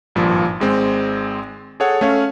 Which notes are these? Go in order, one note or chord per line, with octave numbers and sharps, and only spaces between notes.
G#1 G2 A#2 F3
G#1 G#3 C4
G#4 A4 C#5 F#5
A3 C#4 C#5 F5